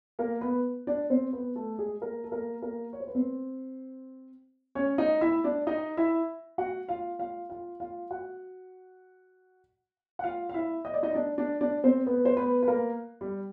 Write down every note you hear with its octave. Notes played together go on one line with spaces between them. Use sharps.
A#3 A#4
B3 B4
D4 D5
C4 C5
B3 B4
A3 A4
G#3 G#4
A#3 A#4
A4
A#3 A#4
A#3 A#4
C#5
C5
B4
C4 C5
C#4 C#5
D#4 D#5
E4 E5
D4 D5
D#4 D#5
E4 E5
F#4 F#5
F4 F5
F4 F5
F4 F5
F4 F5
F#4 F#5
F#5
F4 F5
F5
E4 E5
D#5
D5
D#4 D#5
D4 D5
D4 D5
D4 D5
C4 C5
B3 B4
C5
B3 B4
B4
A#3 A#4
G3 G4